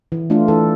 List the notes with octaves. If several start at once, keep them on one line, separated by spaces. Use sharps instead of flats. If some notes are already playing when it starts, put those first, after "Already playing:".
E3
A3 D4 F4
E3 A4